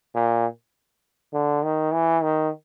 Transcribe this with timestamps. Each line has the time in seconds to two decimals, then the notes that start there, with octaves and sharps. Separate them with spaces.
0.15 A#2
1.33 D3
1.63 D#3
1.93 E3
2.23 D#3